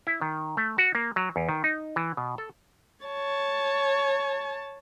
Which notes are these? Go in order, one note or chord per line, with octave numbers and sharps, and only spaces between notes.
E4
D#3
A3
F#4
A#3
F#3
E2
D#3
D#4
E3
B2
A4
C#5 A5